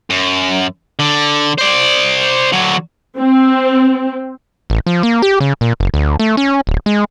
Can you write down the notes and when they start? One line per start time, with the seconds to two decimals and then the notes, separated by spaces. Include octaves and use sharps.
0.10 F#2
0.99 D3
1.58 C5 D5
2.52 D3 F#3
3.19 C4
4.70 A1
4.87 F3
5.03 A#3
5.22 G4
5.40 C#3
5.61 A#2
5.80 F#1
5.94 D2
6.20 A3
6.37 C#4
6.67 D1
6.86 G#3